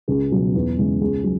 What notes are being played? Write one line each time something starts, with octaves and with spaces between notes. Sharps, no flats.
C#2 G#4
B2 F#3
E2
C#3 E3 G#3
C#2 G#4
F#3